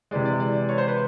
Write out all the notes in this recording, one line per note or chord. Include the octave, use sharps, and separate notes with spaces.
C3 E3 G#3 D5
D5
D5
C#5
C5
B4